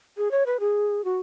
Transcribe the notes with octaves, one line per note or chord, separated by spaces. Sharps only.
G#4
C#5
B4
G#4
F#4